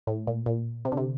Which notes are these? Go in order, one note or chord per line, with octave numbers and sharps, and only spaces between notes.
A2
A#2
A#2
C3
D3
C3